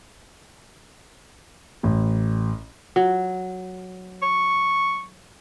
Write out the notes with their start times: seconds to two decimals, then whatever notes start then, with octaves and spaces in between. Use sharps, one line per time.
1.83 A1
2.96 F#3
4.22 C#6